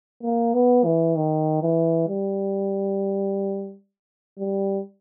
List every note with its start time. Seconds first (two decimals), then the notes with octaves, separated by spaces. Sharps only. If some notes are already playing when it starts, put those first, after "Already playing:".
0.23 A#3
0.54 B3
0.85 E3
1.16 D#3
1.63 E3
2.08 G3
4.39 G3